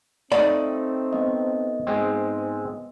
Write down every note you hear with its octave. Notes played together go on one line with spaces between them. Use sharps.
A3 C4 D#4 D5 B5
B3 D#5
G#2 G#3 C4